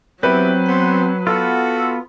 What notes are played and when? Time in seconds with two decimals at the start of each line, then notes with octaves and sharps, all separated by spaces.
0.23 F#3 B3 C4 E4 G4 B4
0.68 B3 C5
1.27 B3 F4 F#4 A4